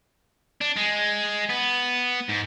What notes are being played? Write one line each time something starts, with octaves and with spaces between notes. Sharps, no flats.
D4
G#3
B3
G#2